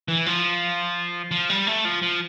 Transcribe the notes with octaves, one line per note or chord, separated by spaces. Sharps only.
E3
F3
F3
G3
A3
F3
F3